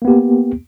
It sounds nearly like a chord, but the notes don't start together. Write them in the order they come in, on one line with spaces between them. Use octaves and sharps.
A#3 B3 G4